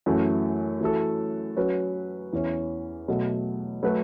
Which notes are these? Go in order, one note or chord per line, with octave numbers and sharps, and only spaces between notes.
F#2 E3 A3 F#4
E3 A3 F#4 A4
F#3 C#4 F#4 B4
E2 E3 C#4
B2 F#3 A3
F#3 A3 F#4 B4